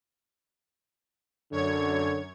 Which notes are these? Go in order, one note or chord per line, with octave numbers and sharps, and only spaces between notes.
F#2 D3 C#5 G#6